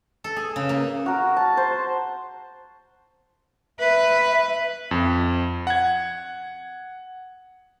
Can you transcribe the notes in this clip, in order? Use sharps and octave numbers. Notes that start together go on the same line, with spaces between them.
A4
G#4
C#3
A#3
F#4 A#4
A5
C5
B4 E5
F2
F#5 G#6